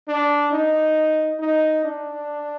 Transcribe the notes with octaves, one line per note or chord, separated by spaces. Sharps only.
D4
D#4
D#4
D4